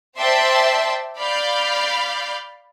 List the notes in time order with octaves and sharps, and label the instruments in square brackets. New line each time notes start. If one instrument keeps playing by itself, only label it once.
[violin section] C5 D5 E5 G5 A5 C6
D5 F5 B5 F6 G6